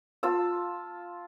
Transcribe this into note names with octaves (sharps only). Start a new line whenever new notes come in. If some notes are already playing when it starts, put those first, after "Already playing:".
F4 A5 E6